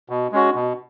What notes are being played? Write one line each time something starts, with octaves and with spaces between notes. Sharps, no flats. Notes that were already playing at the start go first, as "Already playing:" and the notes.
B2
G#3 C#4 F#4
B2